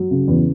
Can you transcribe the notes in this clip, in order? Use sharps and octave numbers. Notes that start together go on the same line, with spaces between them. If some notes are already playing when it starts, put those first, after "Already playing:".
Already playing: F#3
C#3
E2